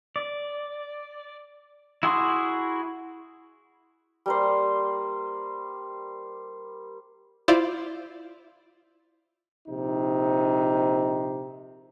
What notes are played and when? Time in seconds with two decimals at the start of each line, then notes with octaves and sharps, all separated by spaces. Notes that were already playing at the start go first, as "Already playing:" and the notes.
0.16 D5
2.03 E4 F#4 G#4 C6
4.26 G3 A#3 C5
7.48 E4 F4 C5 D5 F5
9.68 A#1 C3 D#4